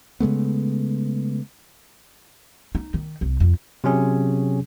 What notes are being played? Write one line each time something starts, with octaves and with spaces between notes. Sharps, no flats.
C#3 G#3 A3 B3
D#4
D#3
C2
F2
C3 F#3 C#4 G#4